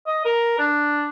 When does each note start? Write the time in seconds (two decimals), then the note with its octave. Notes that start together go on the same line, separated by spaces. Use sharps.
0.07 D#5
0.25 A#4
0.59 D4